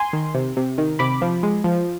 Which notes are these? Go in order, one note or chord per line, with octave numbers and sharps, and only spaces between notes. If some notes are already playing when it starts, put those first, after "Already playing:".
Already playing: G#5 C6
D#3
C3
C3
D#3
C3 B5 D6
F3
G#3
F3